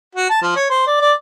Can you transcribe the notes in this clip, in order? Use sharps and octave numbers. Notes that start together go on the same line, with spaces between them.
F#4
A5
F3
C#5
C5
D5
D5